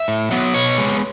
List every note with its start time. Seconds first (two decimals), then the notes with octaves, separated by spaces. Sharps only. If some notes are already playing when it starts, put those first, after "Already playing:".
Already playing: E5
0.08 A2
0.31 F#3 B3
0.54 B2 C#5
0.78 G#3 B3